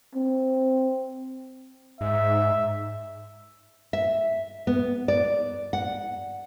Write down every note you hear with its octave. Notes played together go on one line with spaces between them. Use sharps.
C4
G#2 E5
E5
B3
D5
F#5